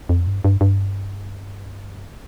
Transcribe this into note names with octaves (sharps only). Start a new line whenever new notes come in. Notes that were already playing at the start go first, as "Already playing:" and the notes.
F2
G2
G2
G2